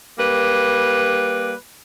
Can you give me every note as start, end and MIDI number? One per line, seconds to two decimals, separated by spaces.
0.18 1.52 55
0.18 1.52 58
0.18 1.52 71